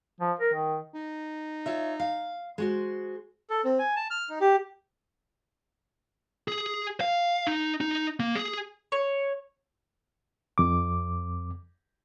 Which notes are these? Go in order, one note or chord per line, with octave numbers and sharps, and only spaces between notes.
F3
A#4
D#3
D#4
F4 C#5 E5
F5
G#3 F#4 C5
A4
C4
G#5
A5
F6
D#4
G4
G#4
F5
D#4
D#4
A#3
G#4
C#5
F2 D6